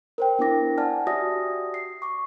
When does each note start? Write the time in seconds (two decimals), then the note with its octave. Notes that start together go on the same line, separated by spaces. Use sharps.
0.18 A#4 C5 G5
0.39 B3 D4 E4 A#4 D6 A#6
0.78 D5 F#5 G#5 A5 F6
1.07 F#4 G4 D5 E5 D#6 A#6
1.74 C7
2.02 C#6 D6